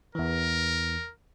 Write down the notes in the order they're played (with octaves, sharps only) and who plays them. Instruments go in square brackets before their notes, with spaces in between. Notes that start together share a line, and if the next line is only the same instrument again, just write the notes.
[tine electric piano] E2 E3 [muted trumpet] A#4